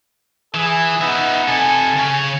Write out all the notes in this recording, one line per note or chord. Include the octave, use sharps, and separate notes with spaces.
E3 G#4
B3 D#4 E5
C3 A4 G#5
C#3 C#4